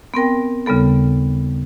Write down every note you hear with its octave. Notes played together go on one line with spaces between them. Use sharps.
B3 C4 A#4 G5
D#2 C#3 G3 B3 A4